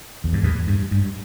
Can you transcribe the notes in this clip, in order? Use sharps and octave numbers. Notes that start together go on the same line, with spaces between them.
E2
G2
E2 A2
G2
G2